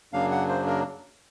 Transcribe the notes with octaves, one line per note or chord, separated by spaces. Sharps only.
F#2 C#3 F#3 A#3 D4 F5
F#5
C5
A#4